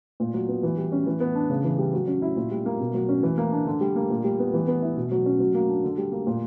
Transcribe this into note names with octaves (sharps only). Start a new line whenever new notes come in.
A#2
F#3
B3
E3
G3
C#4
E3
B3
D4
C#3
E3
G3
F#3
C#4
E4
A#2
G3
A#3
B2
F#3
C#4
E3
A#3
D4
D3
G3
A#3
A#2
G3
B3
E3
B3
E4
B2
F#3
C#4
F#3
A#3
D4
D3
G3
A#3
A#2